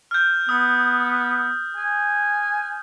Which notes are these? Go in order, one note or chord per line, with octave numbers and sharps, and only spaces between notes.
F6 G6
B3 D#6
G#5